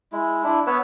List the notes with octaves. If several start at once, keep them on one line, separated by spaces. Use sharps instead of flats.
G#3 E4
D4 E4
B3 B4 C#5 E6